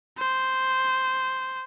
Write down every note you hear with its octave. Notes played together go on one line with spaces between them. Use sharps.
C5